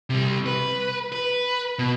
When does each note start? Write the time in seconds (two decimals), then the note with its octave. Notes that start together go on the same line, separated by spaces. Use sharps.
0.10 C3 G3
0.46 B4
1.12 B4
1.79 B2